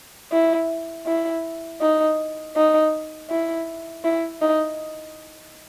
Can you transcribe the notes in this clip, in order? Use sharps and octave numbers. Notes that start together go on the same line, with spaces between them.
E4
E4
D#4
D#4
E4
E4
D#4